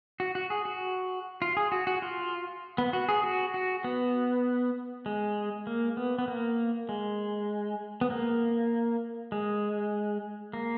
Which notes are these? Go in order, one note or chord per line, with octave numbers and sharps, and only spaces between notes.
F#4
F#4
G#4
F#4
F4
G#4
F#4
F#4
F4
B3
F#4
G#4
F#4
F#4
B3
G#3
A#3
B3
B3
A#3
G#3
B3
A#3
G#3
A#3